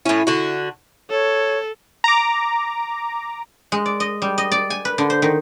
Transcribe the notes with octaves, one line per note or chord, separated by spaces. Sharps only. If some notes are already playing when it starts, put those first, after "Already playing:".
A2 C#4 E4
D3 F#4
A4 C#5
A#5 D6
G#3
D5
D#5
G3
D#5
D5
G#5
B4
D3
C5
D#3